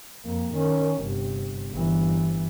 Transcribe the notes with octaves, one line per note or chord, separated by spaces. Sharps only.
F2 A#3
D#3 C#4
G1 C3
G1 E3